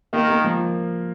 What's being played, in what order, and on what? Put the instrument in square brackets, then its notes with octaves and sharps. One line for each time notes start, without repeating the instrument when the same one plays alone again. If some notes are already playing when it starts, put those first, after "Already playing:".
[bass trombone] D#3 [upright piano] A#3
[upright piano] A#3
F3